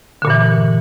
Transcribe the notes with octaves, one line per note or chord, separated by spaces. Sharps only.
G2 A#2 D3 E3